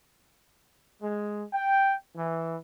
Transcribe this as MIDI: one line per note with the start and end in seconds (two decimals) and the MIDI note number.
1.01 1.43 56
1.53 1.94 79
2.16 2.55 52